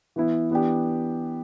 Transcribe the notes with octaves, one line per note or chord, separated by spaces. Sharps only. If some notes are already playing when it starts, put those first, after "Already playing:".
E3 B3 E4
E3 B3 D4 G4